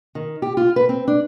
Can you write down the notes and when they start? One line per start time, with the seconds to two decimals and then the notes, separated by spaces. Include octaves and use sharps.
0.15 D#3
0.42 G4
0.57 F4
0.76 B4
0.89 C4
1.08 D4